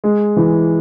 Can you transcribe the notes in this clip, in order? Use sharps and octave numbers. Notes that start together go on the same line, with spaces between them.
G#3
E3